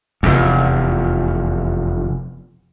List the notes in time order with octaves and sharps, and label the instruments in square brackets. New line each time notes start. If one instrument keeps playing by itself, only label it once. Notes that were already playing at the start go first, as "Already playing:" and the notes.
[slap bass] F1 E2